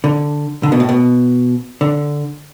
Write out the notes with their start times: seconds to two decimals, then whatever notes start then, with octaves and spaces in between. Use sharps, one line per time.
0.04 D3
0.63 D3
0.72 B2
0.80 A2
0.89 B2
1.81 D3